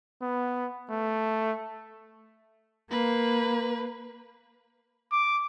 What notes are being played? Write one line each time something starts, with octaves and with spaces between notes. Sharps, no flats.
B3
A3
A#3 B4
D6